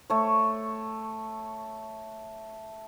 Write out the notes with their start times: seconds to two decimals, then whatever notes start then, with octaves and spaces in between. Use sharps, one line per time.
0.10 A3 C#5